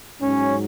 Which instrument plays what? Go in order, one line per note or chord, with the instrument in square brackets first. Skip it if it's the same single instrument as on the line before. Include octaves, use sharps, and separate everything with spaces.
[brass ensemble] G#2 F#3 C#4